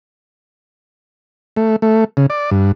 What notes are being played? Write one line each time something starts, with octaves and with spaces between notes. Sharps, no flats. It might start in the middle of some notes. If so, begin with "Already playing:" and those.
A3
A3
C#3
D5
G2